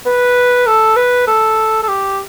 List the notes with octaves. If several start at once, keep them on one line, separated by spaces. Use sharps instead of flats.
B4
A4
B4
A4
A4
G4